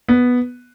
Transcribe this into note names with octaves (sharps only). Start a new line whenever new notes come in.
B3